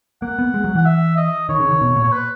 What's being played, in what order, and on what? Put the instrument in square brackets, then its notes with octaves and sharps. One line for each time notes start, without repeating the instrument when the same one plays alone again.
[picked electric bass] A#3 [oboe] F#5
[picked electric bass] B3
G#3
F#3
[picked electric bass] E3 [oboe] F#5
[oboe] E5
D#5
[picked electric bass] D#3 [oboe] C#5
[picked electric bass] C#3
D#3
B2
A#2
[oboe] C#5
B4